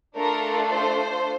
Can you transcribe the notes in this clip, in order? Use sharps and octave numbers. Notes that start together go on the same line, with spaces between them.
A3 D4 F4 A4 A#4
C5